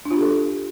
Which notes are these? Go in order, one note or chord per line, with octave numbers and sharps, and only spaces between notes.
D4
F4
G4
A4